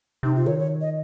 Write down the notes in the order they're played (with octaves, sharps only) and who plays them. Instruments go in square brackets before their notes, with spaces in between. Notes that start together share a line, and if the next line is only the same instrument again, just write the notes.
[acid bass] C3 [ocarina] D#4
[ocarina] F4
[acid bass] D#3 [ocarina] C#5
[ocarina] C#5
D#5